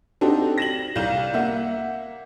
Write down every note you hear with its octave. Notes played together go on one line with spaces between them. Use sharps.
C4 D4 D#4 F#4 G4 A4
A#6 E7 F#7
C2 F5 G6 E7
A#3 E5 F#5